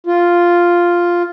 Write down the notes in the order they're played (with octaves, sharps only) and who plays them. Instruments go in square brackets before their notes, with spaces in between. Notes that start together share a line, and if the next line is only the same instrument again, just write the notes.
[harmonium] F4